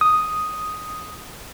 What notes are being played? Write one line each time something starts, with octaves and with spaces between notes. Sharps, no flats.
D#6